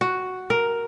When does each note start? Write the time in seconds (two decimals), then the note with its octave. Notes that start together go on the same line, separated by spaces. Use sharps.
0.01 F#4
0.50 A#4